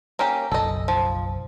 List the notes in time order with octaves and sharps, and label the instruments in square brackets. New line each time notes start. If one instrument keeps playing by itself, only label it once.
[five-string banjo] A#3 C#4 G4
[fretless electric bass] F#1 B1 [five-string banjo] A4 D#5
[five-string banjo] F3